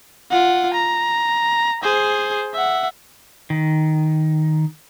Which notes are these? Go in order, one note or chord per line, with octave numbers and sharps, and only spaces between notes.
F4 F#5
A#5
G#4 C5
E5 F#5
D#3